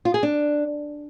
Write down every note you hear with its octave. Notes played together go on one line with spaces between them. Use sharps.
F4
G#4
D4